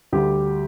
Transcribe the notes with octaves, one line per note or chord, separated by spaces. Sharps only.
D2 D3 G3 G4